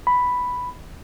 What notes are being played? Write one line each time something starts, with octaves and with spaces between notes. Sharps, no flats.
B5